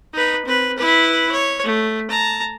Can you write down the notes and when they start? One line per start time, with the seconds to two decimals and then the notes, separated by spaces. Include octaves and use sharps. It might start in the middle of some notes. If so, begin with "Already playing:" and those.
0.14 D#4 B4
0.45 C4 B4
0.78 E4 B4
1.31 C#5
1.64 A3
2.10 A5 A#5